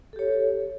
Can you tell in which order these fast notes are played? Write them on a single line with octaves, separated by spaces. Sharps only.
A4 G4 C#5